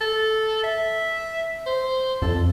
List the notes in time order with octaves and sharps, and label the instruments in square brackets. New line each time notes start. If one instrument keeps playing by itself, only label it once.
[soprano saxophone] A4
E5
C5
[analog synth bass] F2 [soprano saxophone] A4